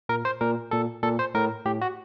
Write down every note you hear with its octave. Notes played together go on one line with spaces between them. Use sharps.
A#2 A#4
C5
A#2 A#4
A#2 A4
A#2 A4
C5
A2 A#4
A2 G4
F#4